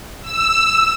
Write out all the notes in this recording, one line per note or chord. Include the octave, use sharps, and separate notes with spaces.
E6